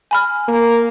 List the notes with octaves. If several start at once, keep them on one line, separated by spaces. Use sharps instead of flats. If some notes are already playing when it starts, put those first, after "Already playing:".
G#5 B5 F6
A#3